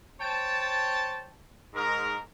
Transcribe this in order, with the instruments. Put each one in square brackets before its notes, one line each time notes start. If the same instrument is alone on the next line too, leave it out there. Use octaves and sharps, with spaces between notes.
[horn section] C5 C#5 G5 A5
G#2 A#4